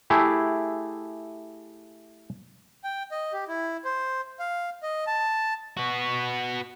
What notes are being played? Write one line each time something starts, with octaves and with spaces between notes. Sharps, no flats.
A3 E4 G4 G#4
G5
D#5
G4
E4
C5
F5
D#5
A5
B3 F#4